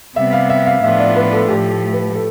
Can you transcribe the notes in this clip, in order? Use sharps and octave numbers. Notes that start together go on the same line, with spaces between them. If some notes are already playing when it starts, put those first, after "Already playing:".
C3 G3 B3 E5
F5
E5
F5
A2 F3 B3 D4 F4 E5
D5
B4
A4
A2 F3 A3 G4
B4
A4